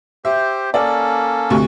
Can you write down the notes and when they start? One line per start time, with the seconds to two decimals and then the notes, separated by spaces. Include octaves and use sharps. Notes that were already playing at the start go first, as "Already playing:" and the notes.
0.25 G4 C5 E5
0.74 A#3 C#4 A4 D5
1.50 D2 C3 C#6